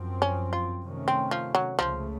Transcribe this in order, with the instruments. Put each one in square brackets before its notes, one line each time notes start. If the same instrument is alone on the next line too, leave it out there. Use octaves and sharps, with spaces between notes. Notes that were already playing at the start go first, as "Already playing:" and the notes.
Already playing: [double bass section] F#2 F3 C4
[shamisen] C#4
F4
[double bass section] C3 D#3 A3 C#4
[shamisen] C4
F3
F#3
[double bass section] C#2 C#3 A3 [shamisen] F3